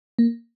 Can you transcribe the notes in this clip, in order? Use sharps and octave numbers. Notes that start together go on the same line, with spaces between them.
A#3